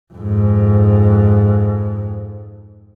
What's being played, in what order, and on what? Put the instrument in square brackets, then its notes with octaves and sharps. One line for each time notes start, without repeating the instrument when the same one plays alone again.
[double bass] F2 G#2